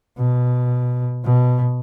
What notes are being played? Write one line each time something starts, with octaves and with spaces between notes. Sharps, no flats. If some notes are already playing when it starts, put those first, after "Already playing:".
B2
B2